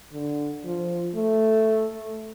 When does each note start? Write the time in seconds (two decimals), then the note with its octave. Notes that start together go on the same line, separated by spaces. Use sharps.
0.13 D3
0.64 F3
1.15 A3